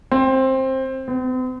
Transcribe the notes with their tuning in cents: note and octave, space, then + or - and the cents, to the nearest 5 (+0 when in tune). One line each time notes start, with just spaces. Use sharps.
C4 +15
C4 -45